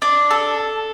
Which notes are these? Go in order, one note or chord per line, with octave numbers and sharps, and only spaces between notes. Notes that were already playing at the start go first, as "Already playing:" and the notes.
D4
A4